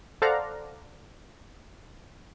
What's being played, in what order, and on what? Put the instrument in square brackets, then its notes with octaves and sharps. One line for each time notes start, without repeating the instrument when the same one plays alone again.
[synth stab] A4 C5 D5 F5 F#5 A#5